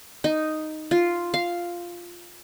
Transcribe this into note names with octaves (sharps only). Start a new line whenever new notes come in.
D#4
F4
F5